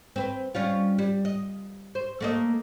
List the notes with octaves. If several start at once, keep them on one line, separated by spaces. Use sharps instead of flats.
C4 B4
G3 C#4 F4
G3
D#5
C5
A3 A#3 D#5